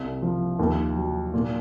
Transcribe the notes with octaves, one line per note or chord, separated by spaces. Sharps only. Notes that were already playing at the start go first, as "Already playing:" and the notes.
Already playing: C2
F3
D#2
F#3
A#2